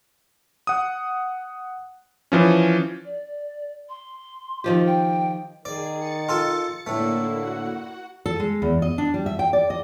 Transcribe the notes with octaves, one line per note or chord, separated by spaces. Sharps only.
F#5 D#6
E3 F3 C#4
D5
C6
D#3 F3 G4
G5
D#3 G#4 D5
A6 C#7
F4 A4 A5
A2 D3 A3 A#3 E4
F#4 F#5
A4
G#3
E2
D#5
D4
G3
E5
G5
D5
D#5